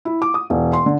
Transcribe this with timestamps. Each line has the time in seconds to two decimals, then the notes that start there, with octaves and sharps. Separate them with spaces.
0.05 E4
0.22 D6
0.34 D#6
0.50 E1
0.73 C6
0.86 D3